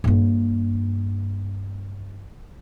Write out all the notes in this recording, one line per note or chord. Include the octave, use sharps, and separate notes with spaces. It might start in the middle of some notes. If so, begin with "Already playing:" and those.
G2 A#3